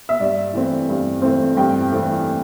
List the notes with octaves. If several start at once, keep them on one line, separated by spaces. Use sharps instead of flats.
E5
G2 D5
E3 A3 C4
G2
E3 A3 C4
G2 G5
E3 A3 C4